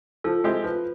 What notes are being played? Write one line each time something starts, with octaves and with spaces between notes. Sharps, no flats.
F3 A4
G#3 C4 E4 G4
F3 B4